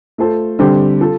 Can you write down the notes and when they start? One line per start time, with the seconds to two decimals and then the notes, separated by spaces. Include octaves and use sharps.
0.18 A3 F4 A4 C5
0.59 D3 G3 C4 G4 C5
1.01 F4 A4